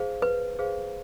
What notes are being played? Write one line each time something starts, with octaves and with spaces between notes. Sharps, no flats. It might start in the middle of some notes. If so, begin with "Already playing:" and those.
Already playing: G#4 C5 F5
B4
G#4 C5 F5